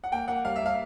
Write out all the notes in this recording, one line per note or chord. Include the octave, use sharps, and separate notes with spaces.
F#5
A#3 G5
A#3 F#5
G3 F5
E5
A#3 F5